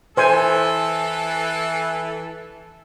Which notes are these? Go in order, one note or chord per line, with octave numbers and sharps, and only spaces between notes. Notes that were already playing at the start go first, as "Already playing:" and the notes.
E3 A4 C5 G#5